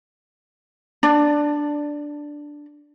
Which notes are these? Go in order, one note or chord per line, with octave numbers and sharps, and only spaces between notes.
D4 D5